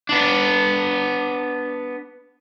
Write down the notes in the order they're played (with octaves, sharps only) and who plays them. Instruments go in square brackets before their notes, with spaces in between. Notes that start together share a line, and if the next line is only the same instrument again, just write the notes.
[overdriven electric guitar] B3 D4